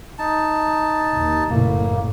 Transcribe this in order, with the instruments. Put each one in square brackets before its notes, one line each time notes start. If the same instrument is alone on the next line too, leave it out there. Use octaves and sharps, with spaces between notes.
[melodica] D#4 A5
[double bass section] D#2
[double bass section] F#1 F#2 A2 [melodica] A#3